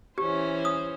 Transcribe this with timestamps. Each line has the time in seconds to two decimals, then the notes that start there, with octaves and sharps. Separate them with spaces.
0.18 E3 C#4 G4 C5
0.65 D#6